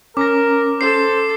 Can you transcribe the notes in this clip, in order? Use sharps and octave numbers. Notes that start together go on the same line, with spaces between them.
C#4 A#4 D6 A#6
A4 C5 C7